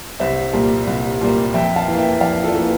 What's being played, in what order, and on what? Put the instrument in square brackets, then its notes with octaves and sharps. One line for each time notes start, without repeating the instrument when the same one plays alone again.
[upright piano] C2 C5 E5
A#2 G3 A#3
C2
A#2 G3 A#3
F2 E5 G5
F5 A5
E3 A#3
E5 G5
F2 D5 F5
F4 A4
E3 A#3